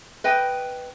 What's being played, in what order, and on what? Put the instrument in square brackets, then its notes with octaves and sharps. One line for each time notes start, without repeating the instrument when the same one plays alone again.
[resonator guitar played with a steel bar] B4 D#5 G5